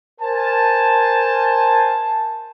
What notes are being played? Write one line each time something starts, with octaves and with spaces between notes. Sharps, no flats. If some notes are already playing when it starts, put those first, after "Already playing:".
A#4 C5 G#5 A5